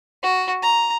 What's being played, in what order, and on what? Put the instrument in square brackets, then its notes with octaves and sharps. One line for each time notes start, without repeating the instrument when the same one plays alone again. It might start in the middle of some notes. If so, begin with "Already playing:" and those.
[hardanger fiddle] F#4
A#5